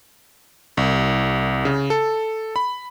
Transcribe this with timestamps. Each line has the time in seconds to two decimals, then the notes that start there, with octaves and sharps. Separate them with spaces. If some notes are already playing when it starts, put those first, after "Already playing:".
0.77 C2
1.65 C#3
1.90 A4
2.56 B5